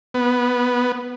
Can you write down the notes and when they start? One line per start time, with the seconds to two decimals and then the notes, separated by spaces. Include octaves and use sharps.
0.14 B3